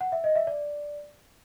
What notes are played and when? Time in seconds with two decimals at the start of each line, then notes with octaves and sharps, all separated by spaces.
0.01 F#5
0.12 E5
0.24 D#5
0.36 E5
0.47 D5